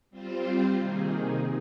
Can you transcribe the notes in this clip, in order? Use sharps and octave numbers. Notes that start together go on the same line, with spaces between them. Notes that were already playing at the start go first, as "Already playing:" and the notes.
G3 C4 F4 C5
C3 D#3 A#3 D#4 G#4